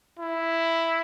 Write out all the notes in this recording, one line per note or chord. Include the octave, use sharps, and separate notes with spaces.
E4